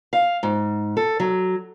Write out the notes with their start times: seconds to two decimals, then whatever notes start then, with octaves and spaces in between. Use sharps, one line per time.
0.13 F5
0.43 G#2
0.97 A4
1.20 F#3